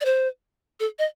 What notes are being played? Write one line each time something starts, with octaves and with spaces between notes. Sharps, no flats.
D5
C5
A4
D#5